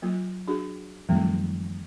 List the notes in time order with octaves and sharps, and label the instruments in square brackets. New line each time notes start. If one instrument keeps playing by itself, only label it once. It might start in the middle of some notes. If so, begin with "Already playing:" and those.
[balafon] F#3 A#3 F4
D4 F#4 G#4
[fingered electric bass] F#2 D#3 F3 [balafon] G3 A3 C4